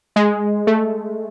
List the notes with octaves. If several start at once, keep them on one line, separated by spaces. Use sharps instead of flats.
G#3
A3